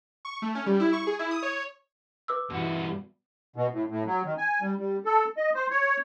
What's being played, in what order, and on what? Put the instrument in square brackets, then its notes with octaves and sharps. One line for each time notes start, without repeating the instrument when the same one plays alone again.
[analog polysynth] C#6
A3
C#4
G3
E4
C#6
G#4
E4
D#6
C#5
[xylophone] B4 D6 E6
[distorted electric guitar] G2 F#4 [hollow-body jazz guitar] B2 [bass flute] E3
[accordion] B2
A2
A2
F#3
D#3
G#5
G3
G3
A4
D#5
C5
C#5